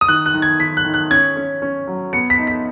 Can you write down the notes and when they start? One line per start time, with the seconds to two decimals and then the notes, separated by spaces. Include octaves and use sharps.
0.01 D#6
0.08 D#3 F#6
0.26 F#6
0.34 D#3
0.42 G#6
0.60 D#3 B6
0.77 F#6
0.85 D#3
0.94 F#6
1.10 C#4 G#6
1.36 C#4
1.62 C#4
1.87 F#3
2.13 B3 C#7
2.30 B6
2.39 D#4
2.47 B6